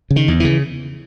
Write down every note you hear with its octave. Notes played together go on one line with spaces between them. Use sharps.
C#3
D#3
E2
C#3 E3